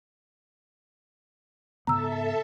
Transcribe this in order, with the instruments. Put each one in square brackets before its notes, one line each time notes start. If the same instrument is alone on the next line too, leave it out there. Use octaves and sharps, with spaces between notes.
[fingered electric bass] G#2 C#3 B3 [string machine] A4 E5 A5 [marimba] A#5 E6